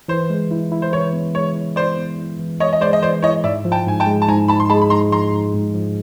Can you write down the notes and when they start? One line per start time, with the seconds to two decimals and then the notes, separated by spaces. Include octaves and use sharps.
0.08 E3 C5
0.30 G#3
0.51 E4
0.72 E4
0.82 C5
0.93 E3 C#5
1.13 B3
1.35 G#3 C#5
1.56 E3
1.76 E4 C5 D5
1.97 B3
2.18 E4
2.39 E3
2.60 G#3 C#5 D#5
2.73 D#5
2.81 G#3 C5 D5
2.93 D#5
3.02 E3 C5 D5
3.23 E4 C#5 D#5
3.44 G#2 D5 E5
3.65 F3
3.72 G5 A5
3.86 G#2 G#5
4.00 G5 A5
4.06 G#3
4.22 A5
4.28 G#2 G#5 A#5
4.48 G#2 A5 B5
4.60 C6
4.70 G#3 A5 B5
4.82 B5
4.90 G#2 A#5 C6
5.12 F3 A#5 C6
5.33 G#2
5.54 G#2
5.74 F3